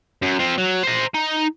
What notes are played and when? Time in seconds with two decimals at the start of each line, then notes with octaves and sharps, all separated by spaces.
0.22 F#2
0.39 C4 F4
0.58 F#3
0.83 C5 A#5
1.14 D#4